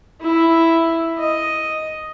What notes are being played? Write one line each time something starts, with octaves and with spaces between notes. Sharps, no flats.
E4
D#5